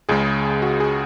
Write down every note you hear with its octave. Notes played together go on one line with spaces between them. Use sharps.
C#2 C#3 G#3 G#4
F#4
G#4